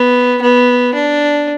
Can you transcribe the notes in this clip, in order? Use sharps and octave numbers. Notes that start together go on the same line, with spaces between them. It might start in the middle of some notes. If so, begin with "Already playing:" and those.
Already playing: B3
B3
D4